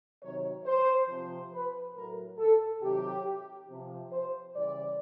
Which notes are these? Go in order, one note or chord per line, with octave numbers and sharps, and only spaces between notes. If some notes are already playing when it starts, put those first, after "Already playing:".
C3 D#3 F#3 C#5
C5
C3 F3
B4
A2 F#3 A#4
A4
C3 D#3 F#3 G4
C3 F3
C5
C#3 E3 G3 D5